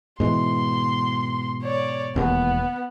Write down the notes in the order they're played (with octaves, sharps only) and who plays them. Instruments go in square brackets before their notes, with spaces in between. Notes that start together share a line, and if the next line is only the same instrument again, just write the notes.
[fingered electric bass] G#2 B2 E3 [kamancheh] C6
[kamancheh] C#5 D5
[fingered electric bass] E1 D#2 [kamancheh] B3